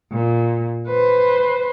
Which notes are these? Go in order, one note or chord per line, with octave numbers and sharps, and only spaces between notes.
A#2
B4 C5